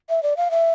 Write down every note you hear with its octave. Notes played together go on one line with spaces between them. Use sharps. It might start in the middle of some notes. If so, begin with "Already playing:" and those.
E5
D5
F5
E5